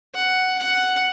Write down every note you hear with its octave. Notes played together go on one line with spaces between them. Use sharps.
F#5
F#5